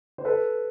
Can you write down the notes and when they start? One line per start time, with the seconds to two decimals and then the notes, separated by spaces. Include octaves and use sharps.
0.18 C5
0.25 A4 B4